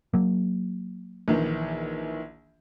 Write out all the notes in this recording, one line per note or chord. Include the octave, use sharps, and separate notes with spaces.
F#3 A#3
A#1 D#3 E3